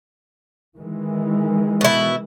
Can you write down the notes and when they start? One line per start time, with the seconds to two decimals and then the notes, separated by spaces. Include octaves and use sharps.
0.78 D#3 E3 G#3
1.81 B2 E4